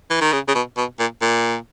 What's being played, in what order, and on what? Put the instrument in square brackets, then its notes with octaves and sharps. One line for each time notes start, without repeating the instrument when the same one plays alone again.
[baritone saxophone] E3
D#3
C#3
C#3
B2
B2
A#2
A#2